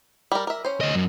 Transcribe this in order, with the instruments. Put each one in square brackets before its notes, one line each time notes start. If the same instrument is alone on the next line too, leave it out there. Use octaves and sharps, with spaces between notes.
[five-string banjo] G3 A#4
A#4 E5
C#4 C5
[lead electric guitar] D2 D#5
F#2